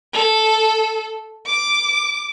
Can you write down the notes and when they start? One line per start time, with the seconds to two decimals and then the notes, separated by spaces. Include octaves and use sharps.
0.13 A4
1.46 D6